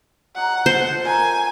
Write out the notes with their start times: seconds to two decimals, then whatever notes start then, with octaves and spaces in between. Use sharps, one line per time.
0.35 F#3 D#4 G#4 F#5
0.66 F3 F4 A4 C5
1.05 C4 D#4 A#4 G#5